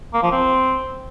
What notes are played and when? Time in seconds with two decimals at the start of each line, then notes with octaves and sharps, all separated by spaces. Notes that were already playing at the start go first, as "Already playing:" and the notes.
0.14 A#3
0.23 F3
0.32 C4